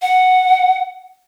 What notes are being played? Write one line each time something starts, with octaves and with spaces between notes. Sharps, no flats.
F#5